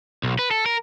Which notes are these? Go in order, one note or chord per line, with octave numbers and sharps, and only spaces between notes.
B1
B4
A4
A#4